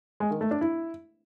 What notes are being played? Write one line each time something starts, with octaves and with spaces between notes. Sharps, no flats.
G#3
D#3
A3
D4
E4